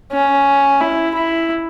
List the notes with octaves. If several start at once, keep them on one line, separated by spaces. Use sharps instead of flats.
C#4
E4
E4